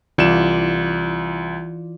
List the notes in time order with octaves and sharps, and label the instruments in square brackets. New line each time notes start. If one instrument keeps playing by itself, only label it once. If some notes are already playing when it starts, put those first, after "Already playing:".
[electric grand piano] C2 E7 [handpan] E3 F4 D5